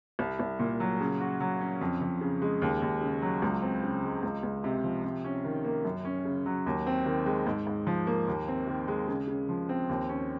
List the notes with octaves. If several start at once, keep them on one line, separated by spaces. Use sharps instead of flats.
C2
C2
A#2
F#3
C#3
F#4
F#3
C#4
F2
F2
C#3
G#3
D#2
D#2
C#3
F#3
C#2
C4
C#3
G#3
C#2
C#2
C3
F3
C3
C#4
D#3
A#3
F#2
C#4
C#3
F#3
D#2
C4
D#3
G#3
G#2
G#2
F3
A#3
D#2
C4
D#3
G#3
C#3
C#3
F3
C4
D#2
C#4